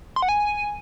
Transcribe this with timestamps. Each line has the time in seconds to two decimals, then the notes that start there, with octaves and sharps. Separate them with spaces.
0.16 C6
0.22 F#5
0.29 G#5